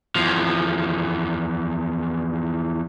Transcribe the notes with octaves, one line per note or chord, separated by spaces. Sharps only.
E2 F3